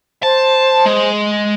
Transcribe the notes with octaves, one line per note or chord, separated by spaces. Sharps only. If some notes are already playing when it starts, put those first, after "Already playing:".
C5 A5
G#3